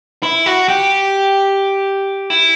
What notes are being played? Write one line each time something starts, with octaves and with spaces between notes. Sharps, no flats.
E4
F#4
G4
E4